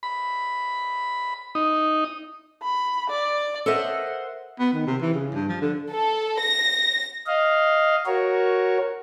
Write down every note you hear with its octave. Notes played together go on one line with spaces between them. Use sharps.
B5
D#4
B5
D5
A4 A#4 C5 D#5 E5 F#5
B3
D#3
C3
E3
C#3
G2
F3
D3
A4
A#6
D#5 F5
F#4 A#4 C#5